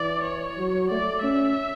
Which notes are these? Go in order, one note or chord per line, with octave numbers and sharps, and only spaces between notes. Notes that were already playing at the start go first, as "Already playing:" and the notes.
Already playing: E3 D5
C#5
F#3
A3 D5
C#4 E5